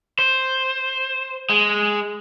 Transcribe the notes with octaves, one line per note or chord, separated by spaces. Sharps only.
C5
G#3